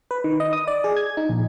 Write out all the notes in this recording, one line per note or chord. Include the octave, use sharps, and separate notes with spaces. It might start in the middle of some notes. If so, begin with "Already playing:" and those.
B4
D#3
D#5
D#6
D5
G#4
G#6
D#4
A#1